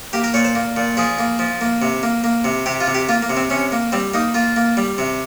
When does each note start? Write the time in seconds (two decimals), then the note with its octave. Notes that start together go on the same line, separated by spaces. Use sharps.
0.13 A#3 G4
0.24 A#4
0.34 A#2 C#5
0.44 C5
0.55 A#3
0.76 A#2
0.97 F3 G#4
1.19 A#3
1.39 F3
1.61 A#3
1.82 C3
2.03 A#3
2.24 A#3
2.44 C3
2.66 C3 G4
2.80 F4
2.87 C3
2.94 G4
3.09 A#3 F4
3.23 A#3
3.30 C3
3.37 C4
3.50 C3 C#4
3.72 A#3
3.92 G3 C4
4.14 A#3 D#4
4.34 A#3 F4
4.56 A#3
4.77 G3
4.98 C3